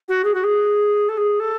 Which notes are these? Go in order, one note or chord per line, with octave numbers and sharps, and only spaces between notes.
F#4
G#4
F#4
G#4
A4
G#4
A4